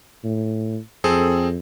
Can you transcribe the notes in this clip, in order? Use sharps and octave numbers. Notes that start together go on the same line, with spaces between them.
A2
F2 C4 G#4 A4